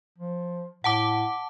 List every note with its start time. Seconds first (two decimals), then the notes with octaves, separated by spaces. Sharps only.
0.18 F3
0.84 A2 F#5 A5 D6